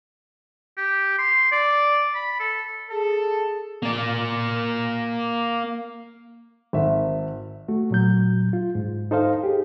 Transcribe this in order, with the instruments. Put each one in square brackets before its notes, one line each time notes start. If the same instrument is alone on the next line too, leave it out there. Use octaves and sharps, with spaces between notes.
[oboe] G4
C6
D5
B5
A4
[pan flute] G#4 [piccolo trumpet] A4
[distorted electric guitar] A#3 D5
[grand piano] G#1 E5
[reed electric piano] A3 F#4
A#2 F#3 G6
F4
G#2
D#4 A4 C5 D#5 F5
G4 G#4